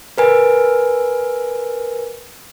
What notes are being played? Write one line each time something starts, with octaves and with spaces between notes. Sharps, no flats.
A#4 B4 G#5